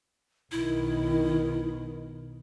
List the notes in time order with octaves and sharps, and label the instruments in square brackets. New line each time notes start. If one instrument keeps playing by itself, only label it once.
[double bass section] B1 B2 D#3 [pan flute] E4